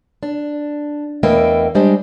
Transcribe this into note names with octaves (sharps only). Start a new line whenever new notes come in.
D4
E2 A3 A#3 B4 D#5 G5
G3 G#3 D4 C5 D#5